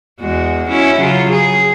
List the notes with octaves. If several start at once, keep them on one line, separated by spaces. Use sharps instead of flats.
E2 G#3 F#4
C#4 E4 F#4
C#3 F#3 F4
G#4